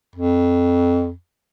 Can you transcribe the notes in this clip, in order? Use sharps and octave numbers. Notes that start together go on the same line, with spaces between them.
F2